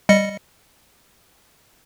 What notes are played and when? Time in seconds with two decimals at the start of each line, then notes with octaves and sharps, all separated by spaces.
0.09 G3 D#5 C#7